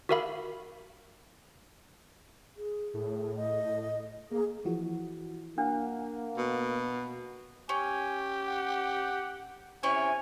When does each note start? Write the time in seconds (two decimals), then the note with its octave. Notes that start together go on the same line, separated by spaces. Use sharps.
0.09 F#4 G4 A#4 E5 F5 B5
2.57 G#4
2.94 A2
3.36 D#5
4.31 A#3 G#4
4.65 E3 F3 F#4
5.58 A#3 D4 F5 F#5
6.38 B2
7.69 C#4 G4 G#5
8.47 F#5
9.83 C3 C#4 E4 C#5 G#5